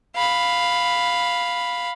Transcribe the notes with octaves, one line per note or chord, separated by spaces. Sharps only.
F5 B5